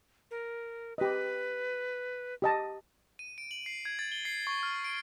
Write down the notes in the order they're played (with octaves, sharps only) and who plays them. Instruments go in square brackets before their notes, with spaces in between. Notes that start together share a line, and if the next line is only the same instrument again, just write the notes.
[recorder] A#4
[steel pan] G4 D#5 [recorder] B4
[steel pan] G4 D#5 A5
[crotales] D#7
D7
F#7
C7
G#6
A6
G7
C7
C#6
F6
D7